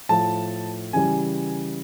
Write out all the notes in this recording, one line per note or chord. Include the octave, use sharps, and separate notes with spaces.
A2 F3 A5
C#3 E3 G3 G#5